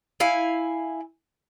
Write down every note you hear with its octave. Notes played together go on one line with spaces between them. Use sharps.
E4 F5 G#5